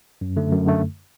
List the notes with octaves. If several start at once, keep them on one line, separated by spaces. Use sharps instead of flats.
F#2
D3 A3
F#2
D3 A3